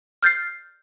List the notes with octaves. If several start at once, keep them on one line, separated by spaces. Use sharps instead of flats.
F6 G6 A6 C7